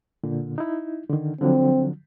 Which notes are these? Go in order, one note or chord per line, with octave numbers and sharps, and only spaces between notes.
A#2 D3
D#4 E4
D3 D#3
D3 F3 F#3 C4